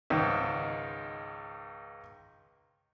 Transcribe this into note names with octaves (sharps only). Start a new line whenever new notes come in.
C#2 G#2 D#3